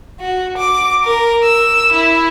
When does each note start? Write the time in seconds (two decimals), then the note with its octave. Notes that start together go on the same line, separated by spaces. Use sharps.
0.20 F#4
0.57 D6
1.04 A#4
1.44 E6
1.92 E4